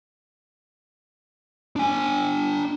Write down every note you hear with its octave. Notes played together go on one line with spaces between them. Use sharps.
D4 G#5